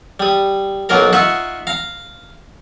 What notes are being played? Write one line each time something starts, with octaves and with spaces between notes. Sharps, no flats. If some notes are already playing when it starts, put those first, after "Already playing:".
G3 D#6
B1 F#3 A#3 F4 A#4 A#5
D#4 F4 E5 F#5 C#6
F5 A#5